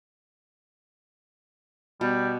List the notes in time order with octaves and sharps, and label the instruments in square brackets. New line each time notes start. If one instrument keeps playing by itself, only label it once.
[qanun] B2 [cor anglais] G3